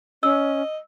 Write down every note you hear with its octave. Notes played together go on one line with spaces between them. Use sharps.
C#4 D#5 E6